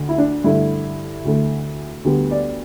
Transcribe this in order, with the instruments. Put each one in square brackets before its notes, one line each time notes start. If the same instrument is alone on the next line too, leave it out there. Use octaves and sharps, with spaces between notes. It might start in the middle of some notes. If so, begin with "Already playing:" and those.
Already playing: [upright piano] D2 D3
E4
D4
G2 D3 A3 E4
D2 D3 A3
D2 D3 G3 B3
D5